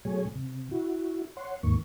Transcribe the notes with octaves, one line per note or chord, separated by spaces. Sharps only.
B2 F#3 A3 G#4 C#5 G#5
C3
E4 F#4
C#5 F#5 C6
D#2 G#2 D#3 A#3 C#6